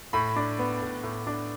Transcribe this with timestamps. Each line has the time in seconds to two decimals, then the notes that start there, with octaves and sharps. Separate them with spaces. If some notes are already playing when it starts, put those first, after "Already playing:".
0.13 A2 B5
0.36 D4
0.59 B3
0.81 A2
1.03 A2
1.27 D4